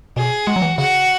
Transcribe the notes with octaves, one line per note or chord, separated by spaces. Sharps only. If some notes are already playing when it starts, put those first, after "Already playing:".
B2 G#4
G#3 F#4
F#3
E3
C#3 F#4